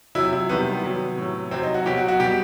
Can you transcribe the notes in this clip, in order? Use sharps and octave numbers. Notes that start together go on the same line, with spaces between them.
C3 F#3 E4
E4
C3 D#3 G3 B3
C3 F#3
A2 F#3
C3 F#3 C4
D#4
F#4
B2 F#3 G4
F#4
F#4
B2 G3 G4